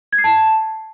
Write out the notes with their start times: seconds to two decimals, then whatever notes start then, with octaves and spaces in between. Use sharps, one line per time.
0.13 G#6
0.18 C7
0.24 A5